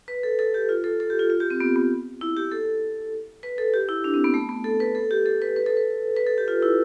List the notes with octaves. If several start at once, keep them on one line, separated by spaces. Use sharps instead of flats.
B4
A4
A4
G4
F4
A4
A4
G4
F4
F4
G4
C4
B3
B3
E4
G4
A4
B4
A4
G4
E4
D4
C4
B3
A3
B3
A4
B4
A4
G4
A4
B4
B4
A4
B4
B4
A4
G4
F4
E4